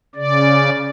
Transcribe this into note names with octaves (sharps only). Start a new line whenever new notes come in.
C#3 D5